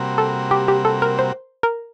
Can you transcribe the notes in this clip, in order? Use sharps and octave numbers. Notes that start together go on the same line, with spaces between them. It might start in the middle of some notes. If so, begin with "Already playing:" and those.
Already playing: C3 G3 A#3 F#4
A4
G4
G4
A4
A#4
C5
A#4